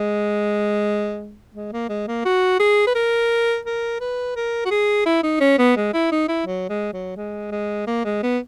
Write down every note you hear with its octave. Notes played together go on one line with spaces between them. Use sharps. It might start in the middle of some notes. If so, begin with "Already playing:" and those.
Already playing: G#3
G#3
A#3
G#3
A#3
F#4
G#4
B4
A#4
A#4
B4
A#4
F#4
G#4
E4
D#4
C#4
B3
G#3
E4
D#4
E4
F#3
G#3
F#3
G#3
G#3
A#3
G#3
B3